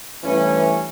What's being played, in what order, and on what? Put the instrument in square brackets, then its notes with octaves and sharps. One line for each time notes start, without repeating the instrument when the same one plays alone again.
[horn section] G2 E3 A3 C#4